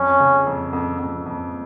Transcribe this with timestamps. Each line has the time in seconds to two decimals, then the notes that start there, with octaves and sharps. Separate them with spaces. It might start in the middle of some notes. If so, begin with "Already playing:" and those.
Already playing: F2 C#4
0.20 C#3
0.46 F2
0.73 F2
0.99 F2
1.26 F2